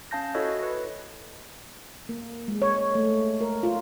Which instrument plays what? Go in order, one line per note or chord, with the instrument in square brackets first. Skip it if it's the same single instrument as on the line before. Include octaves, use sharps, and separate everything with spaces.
[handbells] C#4 F5 A5 G6 A#6
E4 F#4 A4 C#5 D#5
B4
[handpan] A#3
G#3
C#5
A3
A#4
F4